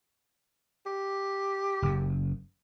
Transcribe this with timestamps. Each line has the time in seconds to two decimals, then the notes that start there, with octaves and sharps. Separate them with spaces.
0.86 G4
1.82 F#1 F#2